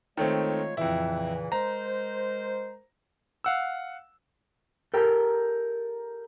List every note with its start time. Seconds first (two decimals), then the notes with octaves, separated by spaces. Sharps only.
0.17 D#3 G#3 A3 C4 F4 C#5
0.77 F2 A#2 C#3 E3 E4
1.52 G#3 A#4 C5 A#5
3.44 F5 F#5 E6
4.94 G4 A4 A#4 G5